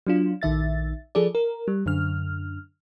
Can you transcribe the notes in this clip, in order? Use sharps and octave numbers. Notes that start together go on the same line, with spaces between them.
F#3 D4 F4
A#1 D#3 E5 A6
F3 G#4 A4 D5
A#4
G3
F#2 D3 F6